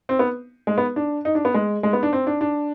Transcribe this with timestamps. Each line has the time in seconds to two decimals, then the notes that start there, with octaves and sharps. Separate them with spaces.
0.09 C4
0.19 B3
0.67 G#3
0.78 B3
0.96 D4
1.25 D#4
1.35 D4
1.45 B3
1.54 G#3
1.83 G#3
1.93 B3
2.03 D4
2.13 C4
2.27 D4
2.41 D4